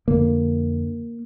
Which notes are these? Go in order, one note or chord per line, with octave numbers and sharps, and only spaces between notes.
F2 D3 A#3